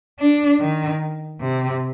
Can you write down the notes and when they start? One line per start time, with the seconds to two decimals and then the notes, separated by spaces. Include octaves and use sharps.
0.19 D4
0.60 D#3
1.40 C3